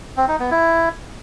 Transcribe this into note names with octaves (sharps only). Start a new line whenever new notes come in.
C4
D#4
B3
E4